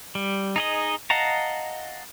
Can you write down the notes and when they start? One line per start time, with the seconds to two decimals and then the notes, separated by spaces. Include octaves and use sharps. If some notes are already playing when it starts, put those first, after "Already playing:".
0.15 G3
0.56 D#4 G#4 D#5
1.10 D#5 F5 F#5 A5 A#5